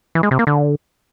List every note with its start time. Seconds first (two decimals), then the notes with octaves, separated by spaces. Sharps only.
0.15 E3
0.23 G#3
0.31 C3
0.39 A#3
0.47 D3